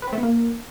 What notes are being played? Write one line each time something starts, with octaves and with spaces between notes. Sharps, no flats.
B4
C4
A3
B3
A#3